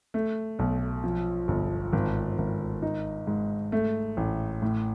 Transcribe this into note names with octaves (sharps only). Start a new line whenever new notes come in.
A3
B1
F3
G1
G#1
G#1
D#4
G#2
A3
A1
A2